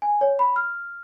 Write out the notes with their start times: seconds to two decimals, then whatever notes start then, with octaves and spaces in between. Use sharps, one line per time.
0.02 G#5
0.21 C#5
0.39 B5
0.56 F6